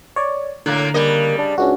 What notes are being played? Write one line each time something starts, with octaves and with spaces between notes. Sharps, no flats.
C#5 D5
A2 D3 A#3 F#6
C#3 G3 A#3 D#5
D4
C#2 C#4 D4 F#4